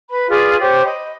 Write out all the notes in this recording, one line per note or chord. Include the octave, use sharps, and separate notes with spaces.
B4 B5
F4 G#4 B4 D5
G4 C5 C#5
D#5 B5